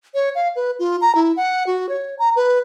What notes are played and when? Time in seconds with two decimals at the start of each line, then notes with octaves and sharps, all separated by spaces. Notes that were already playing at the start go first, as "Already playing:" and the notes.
0.14 C#5
0.35 F5
0.56 B4
0.79 F4
1.01 A#5
1.15 E4
1.37 F#5
1.67 F#4
1.89 C#5
2.19 A#5
2.36 B4